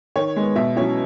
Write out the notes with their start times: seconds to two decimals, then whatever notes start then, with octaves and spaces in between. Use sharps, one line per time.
0.16 D#3 C#5
0.36 G#3 B3
0.55 B2 E5
0.76 F#3 C#4 E4 C#5